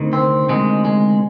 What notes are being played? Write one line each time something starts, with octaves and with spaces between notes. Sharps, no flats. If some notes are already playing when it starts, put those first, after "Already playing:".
Already playing: D2 C3 D#3
C4
D2 C3 D#3 G#3
G#3